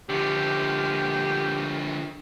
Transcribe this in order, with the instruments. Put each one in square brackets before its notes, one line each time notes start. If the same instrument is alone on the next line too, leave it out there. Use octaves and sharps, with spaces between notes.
[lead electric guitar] D3 F3 [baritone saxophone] G4